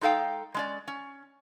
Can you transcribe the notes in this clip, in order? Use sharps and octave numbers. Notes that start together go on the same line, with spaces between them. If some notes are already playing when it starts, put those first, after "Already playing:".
G#3 D#4 A4 F5 G5
G#3 C#4 D5
C#4